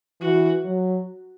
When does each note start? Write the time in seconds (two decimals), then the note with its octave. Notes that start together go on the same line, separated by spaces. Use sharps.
0.21 E3 F#4
0.65 F#3